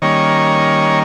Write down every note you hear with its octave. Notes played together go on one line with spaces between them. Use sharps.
D#3 G3 A#3 C#4 C#5